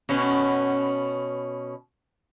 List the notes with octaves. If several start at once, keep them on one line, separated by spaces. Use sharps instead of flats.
B2 C#4